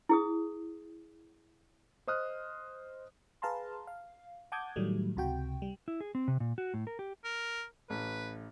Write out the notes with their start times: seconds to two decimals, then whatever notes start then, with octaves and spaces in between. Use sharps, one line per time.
0.09 E4 G#4 D#6
2.07 C5 D#5 D#6 F6 F#6
3.42 G#4 B4 F5 A5 A#5 C6
3.87 F5
4.52 F#5 A5 D6 D#6 G6 G#6
4.76 A2 D#3 F#3 G3 A3
5.16 C#2 C3 F#4 G5
5.62 G3
5.88 E4
6.01 G#4
6.15 C4
6.28 C3
6.40 A#2
6.58 F#4
6.74 A2
6.87 A#4
6.99 G4
7.24 A#4
7.90 A1 B4